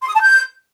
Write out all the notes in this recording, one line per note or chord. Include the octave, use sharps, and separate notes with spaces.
C6
D#6
A5
G6